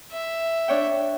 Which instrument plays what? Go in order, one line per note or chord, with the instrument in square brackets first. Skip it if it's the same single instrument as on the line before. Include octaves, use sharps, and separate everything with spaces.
[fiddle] E5
[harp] D4 C#5 G5